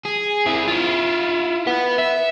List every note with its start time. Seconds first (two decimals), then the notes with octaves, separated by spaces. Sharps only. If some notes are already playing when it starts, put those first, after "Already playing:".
0.05 G#4
0.46 C4 E4
0.68 E4 F4
1.67 B4 F#5
1.99 E5